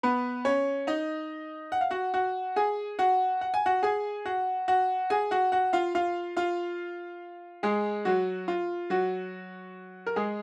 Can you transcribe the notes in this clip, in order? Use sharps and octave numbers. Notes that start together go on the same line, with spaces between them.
B3 B4
C#4 C#5
D#4 D#5
F#5
F5
F#4 F#5
F#4 F#5
G#4 G#5
F#4 F#5
F#5
G#5
F#4 F#5
G#4 G#5
F#4 F#5
F#4 F#5
G#4 G#5
F#4 F#5
F#4 F#5
F4 F5
F4 F5
F4 F5
G#3 G#4
F#3 F#4
F4
F#3 F#4
A#4
G#3 G#4